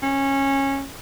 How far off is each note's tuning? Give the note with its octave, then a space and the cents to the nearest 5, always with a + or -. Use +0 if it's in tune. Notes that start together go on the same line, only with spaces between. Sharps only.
C#4 -20